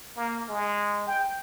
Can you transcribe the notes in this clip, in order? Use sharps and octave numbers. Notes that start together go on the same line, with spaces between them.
A#3
G#3
G5